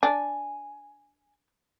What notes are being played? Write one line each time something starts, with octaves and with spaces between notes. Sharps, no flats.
D4 G#5